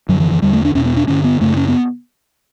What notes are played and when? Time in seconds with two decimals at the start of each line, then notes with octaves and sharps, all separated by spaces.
0.09 F#2 D3 F#3
0.20 E3
0.31 E3
0.42 E2 D3 G3
0.53 A3
0.65 D4
0.74 E2 B2 C#4
0.85 B3
0.97 D4
1.08 G2 D3 C#4
1.24 B3
1.40 F#2 C#3 A3
1.57 C#4
1.68 B3